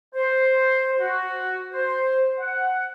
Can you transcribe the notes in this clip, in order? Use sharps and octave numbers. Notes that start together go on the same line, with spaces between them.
C5
F#4
C5
F#5